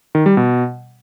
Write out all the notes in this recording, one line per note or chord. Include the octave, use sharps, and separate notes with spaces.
D#3
G3
B2